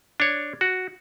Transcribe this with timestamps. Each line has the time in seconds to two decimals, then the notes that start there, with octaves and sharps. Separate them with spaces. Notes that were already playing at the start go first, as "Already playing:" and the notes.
0.20 D4 C#5
0.61 F#4